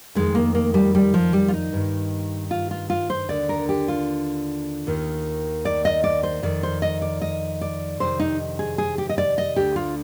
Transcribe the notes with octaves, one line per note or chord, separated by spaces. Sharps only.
F2 D#3 G#3
A#3
A#3
G3
G3
F3
G3
F4
D#4
G2 D#3
F4
F4
F4
C5
D#2 D3 D5
A#4
G4
F4
D#2 D#3
D5
D#5
D5
C5
F2 D#3 D5
C5
D#5
D5
D#5
D5
F2 C3 D#3 C5
D#4
G#4
G#4
G4
D#5
D5
D#5
D2 D3 G4
F4